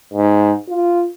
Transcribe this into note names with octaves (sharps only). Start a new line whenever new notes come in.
G#2
F4